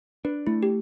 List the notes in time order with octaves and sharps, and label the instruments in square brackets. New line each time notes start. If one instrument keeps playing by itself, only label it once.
[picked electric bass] D4 [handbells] B4
[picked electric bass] A3 [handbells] E4
[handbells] G4